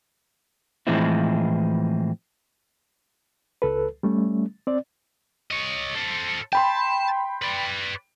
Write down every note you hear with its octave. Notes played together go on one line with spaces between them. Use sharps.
A2 E3 F3 G#3 C4 E4
C#2 A4 B4
G3 A3 C#4
C4 D5
C#5 D#5
A4 C5
G5 A5 B5 C6
B4 D5